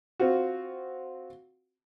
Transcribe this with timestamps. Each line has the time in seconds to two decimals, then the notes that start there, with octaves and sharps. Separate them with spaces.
0.20 C4 F4 F#4